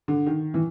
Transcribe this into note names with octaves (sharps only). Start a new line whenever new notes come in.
D3
D#3
E3